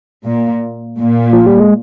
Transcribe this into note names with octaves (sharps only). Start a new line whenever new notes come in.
A#2
A#2
F3
G3
G#3